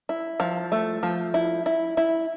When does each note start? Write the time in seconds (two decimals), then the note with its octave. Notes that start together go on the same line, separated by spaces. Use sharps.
0.09 E4
0.40 F3
0.72 A3
1.03 F3
1.34 E4
1.66 E4
1.97 E4